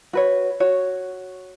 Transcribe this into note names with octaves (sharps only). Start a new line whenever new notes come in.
F#4 B4 C#5
F#4 C#5